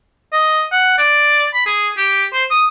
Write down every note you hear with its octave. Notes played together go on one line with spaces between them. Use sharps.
D#5
F#5
D5
B5
G#4
G4
C5
D#6